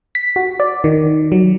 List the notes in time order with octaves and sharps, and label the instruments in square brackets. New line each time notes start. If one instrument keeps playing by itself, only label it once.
[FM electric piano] B6
F#4
D5
D#3
F#3